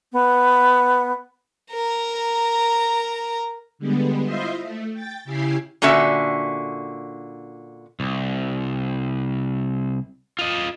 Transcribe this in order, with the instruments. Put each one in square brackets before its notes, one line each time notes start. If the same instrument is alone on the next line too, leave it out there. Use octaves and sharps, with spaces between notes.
[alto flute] B3
[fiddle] A#4 A#5
[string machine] D3 G3 G#3 B3
E4 F4 C5 D#5 E5 C6
A3
G5 A6
C#3 E4 G4 G#5 C7
[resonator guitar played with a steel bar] A#2 D3 C#4 F#4 E5
[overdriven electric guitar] C2
F4 D#5